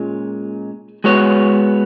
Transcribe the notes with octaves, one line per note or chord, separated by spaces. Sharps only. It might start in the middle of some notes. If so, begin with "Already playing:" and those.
Already playing: A#2 G#3 C#4
G#3 B3 F#4 C#5